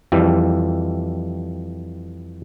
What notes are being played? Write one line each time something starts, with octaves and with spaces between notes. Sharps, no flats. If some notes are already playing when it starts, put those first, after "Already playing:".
F2 E3 G3